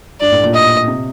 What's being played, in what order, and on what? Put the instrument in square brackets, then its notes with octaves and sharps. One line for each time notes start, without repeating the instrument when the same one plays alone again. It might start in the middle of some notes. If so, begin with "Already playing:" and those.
[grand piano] G2 [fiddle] D5
[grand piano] A2
A#2
[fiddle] D#5
[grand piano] C3